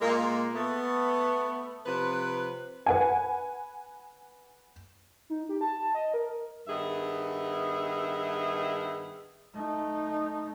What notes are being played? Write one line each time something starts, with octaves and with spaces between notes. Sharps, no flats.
A#2 G#3 A#3
A3 B3
C3 F3 B4
B4 F#5 G#5
D#4
G4
A5
D#5
A#4
G2 D#3 B3 G#4 E5
A3 D#4